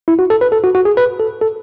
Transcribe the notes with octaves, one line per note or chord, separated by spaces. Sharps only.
E4
F#4
A4
B4
A4
F#4
F#4
G#4
B4
A4
A4